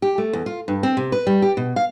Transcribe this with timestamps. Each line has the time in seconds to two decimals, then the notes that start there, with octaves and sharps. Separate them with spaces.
0.02 G4
0.18 A3
0.33 E2
0.46 F4
0.68 G2
0.83 C4
0.97 C3
1.12 B4
1.27 G3
1.42 G4
1.57 B2
1.76 F5